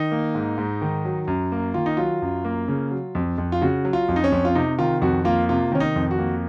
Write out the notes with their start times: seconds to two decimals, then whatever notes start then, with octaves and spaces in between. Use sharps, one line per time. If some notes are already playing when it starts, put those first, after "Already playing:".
Already playing: D#3 D#4
0.12 A#3
0.35 G#2
0.58 G#2
0.82 D#3
1.05 F#3
1.27 F#2
1.52 A#3
1.74 D#3 F4
1.86 D#4
1.97 F#3 F4
2.22 F#2
2.45 A#3
2.68 C#3
2.91 F#3
3.15 F2
3.38 F2
3.52 F4
3.62 C#3 F#4
3.85 F#3
3.93 F4
4.08 F2
4.16 D#4
4.24 C#4
4.32 F2
4.45 F4
4.55 C3 D#4
4.78 D#3 F4
5.02 F2 F#4
5.25 A#3 F4
5.49 C3 F4
5.72 D#3 C#4
5.80 D#4
5.96 F2
6.11 F#4
6.18 A#3